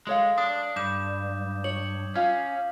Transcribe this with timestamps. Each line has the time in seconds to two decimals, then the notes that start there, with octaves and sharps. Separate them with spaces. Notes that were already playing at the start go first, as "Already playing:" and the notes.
0.07 G#3 A4 C#5 F5
0.38 D4 D#6
0.76 G2 D6 G6 E7
1.64 C#5 F#7
2.15 C#4 F4 F5